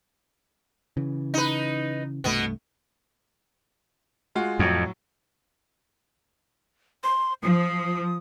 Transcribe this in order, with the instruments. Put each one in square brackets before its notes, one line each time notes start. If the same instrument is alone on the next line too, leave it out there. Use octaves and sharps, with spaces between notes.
[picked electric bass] C#3 E3
[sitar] D#4 B4
[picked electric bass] C2 G2 A3 [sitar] B2 B3
[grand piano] G#3 F4 F#4
[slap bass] F2 [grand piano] A2 F#3
[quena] C6
[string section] F3 [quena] D#6